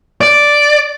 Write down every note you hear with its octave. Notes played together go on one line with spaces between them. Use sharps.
D5